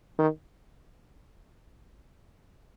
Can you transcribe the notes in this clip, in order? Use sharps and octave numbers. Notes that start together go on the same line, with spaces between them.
D#3